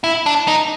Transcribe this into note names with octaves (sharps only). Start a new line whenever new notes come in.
E4
D4
D#4